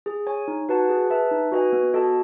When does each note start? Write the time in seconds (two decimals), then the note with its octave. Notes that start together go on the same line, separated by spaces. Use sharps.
0.06 G#4
0.27 C#5 G#5
0.48 D#4
0.69 F#4 B4 F#5 A5
0.89 G#4
1.10 B4 E5 A5
1.31 D#4
1.52 F#4 B4 D#5 G#5
1.73 B3
1.93 F#4 A4 D#5 A5